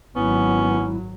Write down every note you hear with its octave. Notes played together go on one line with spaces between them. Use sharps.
G#1 F#3 B3 C#4 E4